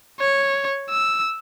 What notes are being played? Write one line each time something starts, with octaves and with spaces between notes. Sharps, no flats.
C#5
E6